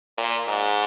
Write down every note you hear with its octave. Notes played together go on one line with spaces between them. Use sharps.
A#2
G#2